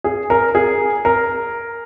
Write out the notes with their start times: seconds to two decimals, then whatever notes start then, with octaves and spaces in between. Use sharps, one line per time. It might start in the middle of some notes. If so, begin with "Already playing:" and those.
0.04 G#4
0.30 A#4
0.55 G#4
1.05 A#4